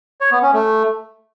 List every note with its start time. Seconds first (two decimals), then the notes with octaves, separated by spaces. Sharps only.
0.21 C#5
0.32 B3
0.42 C#4
0.53 A3